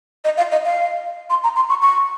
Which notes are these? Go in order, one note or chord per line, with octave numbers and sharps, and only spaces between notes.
D#5
F5
D#5
F5
C6
A#5
C6
C#6
C#6